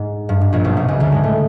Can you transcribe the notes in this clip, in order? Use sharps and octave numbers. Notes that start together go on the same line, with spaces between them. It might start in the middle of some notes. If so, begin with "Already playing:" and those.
Already playing: G#2
G2
G#2
A#1 A#2
B1 B2
C2 C3
C#2 C#3
D2 D3
G#2 G#3
A2 A3